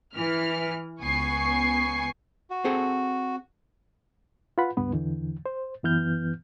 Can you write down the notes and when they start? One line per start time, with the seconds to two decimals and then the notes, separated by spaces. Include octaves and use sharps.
0.14 E3 F6
1.01 C#2 B3 G#5 C#6 C7
2.50 F#4
2.64 C4 G#4 A4
4.58 F4 B4 F#5 B5
4.77 C#2 G2 B3 B4
4.93 E2 D3 E3
5.46 C5
5.83 F#2 E3 B3 F6 G6